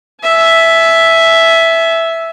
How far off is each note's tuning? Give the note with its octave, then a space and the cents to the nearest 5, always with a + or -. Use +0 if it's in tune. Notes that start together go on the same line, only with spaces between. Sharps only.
E5 +0 G#5 +40